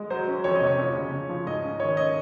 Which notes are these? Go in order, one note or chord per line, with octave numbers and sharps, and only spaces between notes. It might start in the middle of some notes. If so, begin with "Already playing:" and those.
Already playing: G#3
F#3 C5
C#4
F2 C#5
D#5
C3
C#5
F3
C#3
C#3
F3
G#2 D#5
C#4
D#3 C#5
D#3 D#5